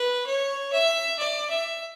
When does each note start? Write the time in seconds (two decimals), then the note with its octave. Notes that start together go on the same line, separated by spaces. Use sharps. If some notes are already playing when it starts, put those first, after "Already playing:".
Already playing: B4
0.26 C#5
0.72 E5
1.19 D5
1.50 E5